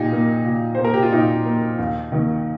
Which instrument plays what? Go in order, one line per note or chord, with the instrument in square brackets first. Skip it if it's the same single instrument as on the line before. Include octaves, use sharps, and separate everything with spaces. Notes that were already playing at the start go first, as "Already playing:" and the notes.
Already playing: [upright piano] A#2 D#4 G4
A#3
A#2
A#3 C5
A#4
G4
F4
A#2 D#4
A#3
D#2
D#3 A#3